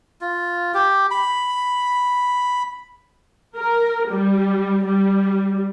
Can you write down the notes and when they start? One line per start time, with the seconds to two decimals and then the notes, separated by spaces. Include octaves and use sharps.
0.21 F4
0.74 G4
1.11 B5
3.58 A#4
4.10 G3
4.86 G3